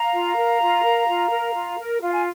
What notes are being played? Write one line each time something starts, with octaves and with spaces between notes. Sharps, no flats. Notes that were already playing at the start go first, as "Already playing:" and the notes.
Already playing: F5 A#5
F4
A#4
F4
A#4
F4
A#4
F4
A#4
F4 F5
G#5